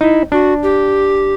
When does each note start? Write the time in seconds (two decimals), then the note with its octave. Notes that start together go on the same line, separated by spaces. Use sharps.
0.01 D#4 E4
0.32 D4 F#4
0.63 G4